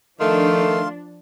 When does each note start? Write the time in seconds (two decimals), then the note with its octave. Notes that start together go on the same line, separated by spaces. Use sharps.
0.20 D#3 F3 A3 D4 F5 C6